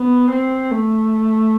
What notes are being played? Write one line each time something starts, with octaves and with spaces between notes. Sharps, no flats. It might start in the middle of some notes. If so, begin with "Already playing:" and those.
Already playing: B3
C4
A3